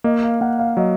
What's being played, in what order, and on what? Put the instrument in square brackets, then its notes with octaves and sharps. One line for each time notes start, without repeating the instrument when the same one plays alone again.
[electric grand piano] A#3 [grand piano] D#5
[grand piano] F5
[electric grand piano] A#3 [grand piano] F#5
[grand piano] F5
[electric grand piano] F#3 [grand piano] D#5